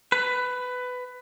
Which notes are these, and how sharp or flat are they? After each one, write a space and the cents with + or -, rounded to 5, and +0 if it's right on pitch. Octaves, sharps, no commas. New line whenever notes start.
B4 +15